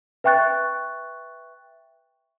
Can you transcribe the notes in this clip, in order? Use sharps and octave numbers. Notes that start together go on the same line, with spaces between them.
B4 E5 G5 C#6 F#6 A6